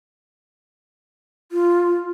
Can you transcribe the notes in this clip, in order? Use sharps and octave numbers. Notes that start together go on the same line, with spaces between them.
F4